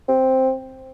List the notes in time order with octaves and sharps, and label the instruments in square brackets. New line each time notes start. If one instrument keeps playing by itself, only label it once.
[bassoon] C4